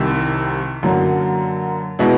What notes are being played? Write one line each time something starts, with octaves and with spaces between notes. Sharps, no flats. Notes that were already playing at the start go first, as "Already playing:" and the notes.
Already playing: C2 C3 D#3
F#2 D3 F#3 A#3
B2 G#3 B3 E4